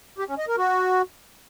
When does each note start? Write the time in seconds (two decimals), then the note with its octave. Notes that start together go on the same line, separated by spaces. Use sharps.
0.18 G4
0.28 C#4
0.38 D#5
0.48 A#4
0.58 F#4